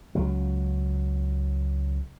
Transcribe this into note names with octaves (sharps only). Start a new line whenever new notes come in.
C#2 F#3